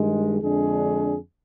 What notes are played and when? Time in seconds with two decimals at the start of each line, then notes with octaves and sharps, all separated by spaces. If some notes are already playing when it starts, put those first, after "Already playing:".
Already playing: G2 D#3 G#3
0.40 F2 D3 G#3 D4 G#4